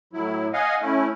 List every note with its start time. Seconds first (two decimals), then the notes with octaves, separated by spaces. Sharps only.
0.13 A2 F#3 E4
0.53 D#5 F5 F#5 G#5
0.81 A3 C#4 E4